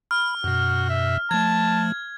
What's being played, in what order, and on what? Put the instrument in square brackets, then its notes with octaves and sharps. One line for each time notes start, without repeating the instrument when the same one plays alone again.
[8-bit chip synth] B5 [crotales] F6
[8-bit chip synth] F#2 B2 [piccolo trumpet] F#4
[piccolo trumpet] E5
[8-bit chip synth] F3 A3 [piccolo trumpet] A5 [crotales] G#6